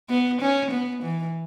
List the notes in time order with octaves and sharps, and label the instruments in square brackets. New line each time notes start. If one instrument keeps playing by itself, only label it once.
[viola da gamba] B3
C#4
B3
E3